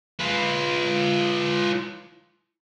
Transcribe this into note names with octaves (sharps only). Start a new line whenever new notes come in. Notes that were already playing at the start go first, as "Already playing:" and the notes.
F4 B4